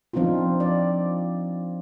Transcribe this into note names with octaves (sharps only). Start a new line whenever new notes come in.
F3 C4 D4 D#4 F4
D5